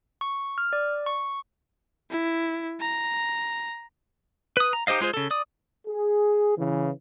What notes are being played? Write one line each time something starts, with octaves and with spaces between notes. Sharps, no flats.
C#6
F6
D5
C#6
E4
A#5
B4 D#6
A#5
D#4 G4 C5 D#5 F5
G#3 F4 G#4 C5
C#3 A4
D5 D#6
G#4
C#3 E3